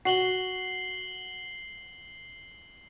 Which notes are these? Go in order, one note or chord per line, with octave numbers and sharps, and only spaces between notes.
F#4 C7 F#7 G7